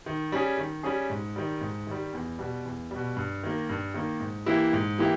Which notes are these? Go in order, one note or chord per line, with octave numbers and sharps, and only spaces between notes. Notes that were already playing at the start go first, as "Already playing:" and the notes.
D#3
G3 C#4 G#4
D#3
G3 C#4 G#4
G#2
D#3 G3
G#2
D#3 G3
E2
B2 G3
E2
B2 G3
G2
D#3 A#3
G2
D#3 A#3
G#2
E3 A#3 E4 G4
G#2
E3 A#3 E4 G4